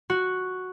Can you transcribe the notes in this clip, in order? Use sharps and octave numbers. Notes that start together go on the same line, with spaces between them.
F#4